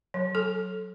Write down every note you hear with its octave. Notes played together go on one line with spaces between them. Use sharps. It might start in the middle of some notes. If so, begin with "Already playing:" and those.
F#3
A4